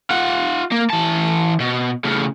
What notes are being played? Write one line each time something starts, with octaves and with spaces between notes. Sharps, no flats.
F4 F#5
A#3
E3 A5
B2
A2 C#3